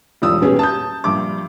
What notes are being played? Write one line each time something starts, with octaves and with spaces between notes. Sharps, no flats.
E1 F3 G3 D#6 E6
D#1 F#3 B3 C#4 G4 G#4
A5 D#6 G6
A#1 G2 D6